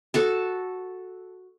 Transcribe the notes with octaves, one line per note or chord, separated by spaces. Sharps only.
F#4 A4 A5